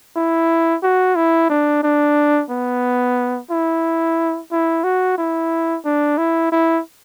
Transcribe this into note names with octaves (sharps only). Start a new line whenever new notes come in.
E4
F#4
E4
D4
D4
B3
E4
E4
F#4
E4
D4
E4
E4